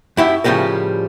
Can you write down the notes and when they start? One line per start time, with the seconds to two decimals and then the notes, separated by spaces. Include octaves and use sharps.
0.17 F#2 E4 G4 E5
0.44 A2 C#3 F3 G3 A#4